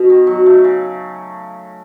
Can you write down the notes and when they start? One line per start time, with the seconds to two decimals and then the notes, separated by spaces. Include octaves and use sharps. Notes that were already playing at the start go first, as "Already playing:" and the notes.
Already playing: B2
0.09 D#3
0.27 F#3
0.46 A3
0.64 C#3